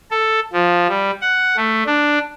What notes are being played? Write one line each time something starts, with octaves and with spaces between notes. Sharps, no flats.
A4
F3
G3
F#5
A3
D4